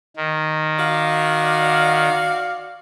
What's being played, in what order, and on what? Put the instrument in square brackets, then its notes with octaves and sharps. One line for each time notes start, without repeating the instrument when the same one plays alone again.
[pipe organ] D#3
[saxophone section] F#4 D5 F5